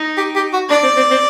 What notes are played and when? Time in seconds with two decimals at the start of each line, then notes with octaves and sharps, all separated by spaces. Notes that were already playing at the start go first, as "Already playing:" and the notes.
Already playing: D#4
0.18 G4
0.36 G4
0.53 F#4
0.70 D4 D5
0.83 C4
0.97 C4
1.11 C4